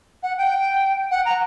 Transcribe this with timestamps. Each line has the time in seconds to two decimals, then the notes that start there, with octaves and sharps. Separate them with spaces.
0.23 F#5
0.38 G5
1.11 F#5
1.25 A#5